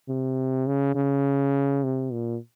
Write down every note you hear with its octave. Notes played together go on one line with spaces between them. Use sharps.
C3
C#3
C#3
C3
A#2